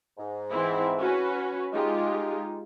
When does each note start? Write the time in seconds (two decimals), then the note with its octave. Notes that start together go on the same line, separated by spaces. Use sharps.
0.18 G#2
0.53 E3 C4 E4
1.01 C#4 F#4 B4
1.73 G#3 D#4 F4 G4